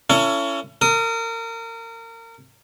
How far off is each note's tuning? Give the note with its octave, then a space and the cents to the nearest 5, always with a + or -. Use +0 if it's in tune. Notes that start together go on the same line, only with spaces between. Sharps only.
C#4 +20 E4 +40 A4 +45
A#4 -30 D#6 +15